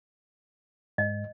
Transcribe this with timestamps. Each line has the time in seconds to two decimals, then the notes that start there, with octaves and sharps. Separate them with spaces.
0.98 G#2 D#5